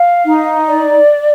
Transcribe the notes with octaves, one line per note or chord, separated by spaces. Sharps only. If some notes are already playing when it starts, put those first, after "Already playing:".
Already playing: F5
D#4
D5